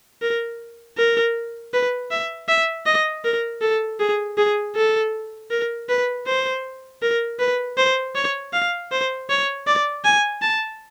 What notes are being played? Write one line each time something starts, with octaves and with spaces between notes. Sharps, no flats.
A#4
A#4
B4
E5
E5
D#5
A#4
A4
G#4
G#4
A4
A#4
B4
C5
A#4
B4
C5
C#5
F5
C5
C#5
D5
G#5
A5